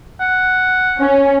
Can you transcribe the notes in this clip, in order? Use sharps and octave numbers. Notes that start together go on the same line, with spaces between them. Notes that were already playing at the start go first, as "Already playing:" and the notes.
F#5
C#4